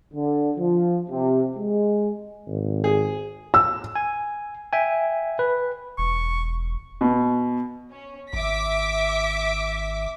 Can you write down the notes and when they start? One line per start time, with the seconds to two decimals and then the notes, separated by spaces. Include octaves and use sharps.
0.14 D3
0.58 F3
1.10 C3
1.58 G#3
2.47 G#1
2.84 G#4
3.54 E6
3.95 G#5
4.73 E5 G5 G#5
5.39 B4
5.98 E1 C#6
7.01 B2
7.91 C#4
8.33 G#1 E5 D6 B6